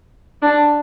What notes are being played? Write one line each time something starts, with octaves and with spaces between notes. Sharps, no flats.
D4